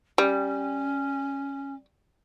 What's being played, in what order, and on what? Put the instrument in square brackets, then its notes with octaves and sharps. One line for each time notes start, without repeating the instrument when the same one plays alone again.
[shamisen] G3 [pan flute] C#4